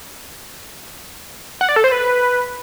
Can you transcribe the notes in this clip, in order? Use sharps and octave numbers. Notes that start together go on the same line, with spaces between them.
F#5
D5
A4
C5
B4